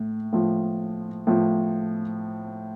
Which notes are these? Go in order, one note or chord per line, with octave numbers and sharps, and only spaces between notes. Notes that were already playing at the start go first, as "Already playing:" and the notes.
Already playing: A2
A2 F3
A2 F3